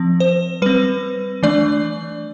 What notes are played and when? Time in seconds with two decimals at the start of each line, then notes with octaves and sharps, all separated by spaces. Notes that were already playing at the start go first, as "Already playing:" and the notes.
Already playing: F3 C4
0.20 C5
0.62 G3 C4 B4
1.43 E3 A3 D4 D5